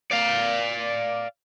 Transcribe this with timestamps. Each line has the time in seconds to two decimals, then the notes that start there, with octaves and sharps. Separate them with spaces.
0.11 D5 F5